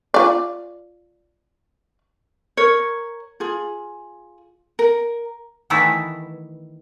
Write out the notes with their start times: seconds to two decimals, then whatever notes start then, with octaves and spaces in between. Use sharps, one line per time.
0.14 F4 D5
2.57 A#4 C#5
3.40 F4 G#4
4.79 A#4
5.70 D#3 E3 A3 B3 D#4 E4